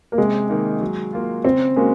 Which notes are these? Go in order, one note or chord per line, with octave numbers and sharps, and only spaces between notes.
A#3
C3 G#3
D#3 A#3 D#4
F#3
A#3 F4
C#3 C4
G#3 A#3 C#4 F#4